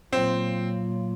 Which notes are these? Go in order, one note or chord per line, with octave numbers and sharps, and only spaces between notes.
A#2 F#3 A#3 C4 F4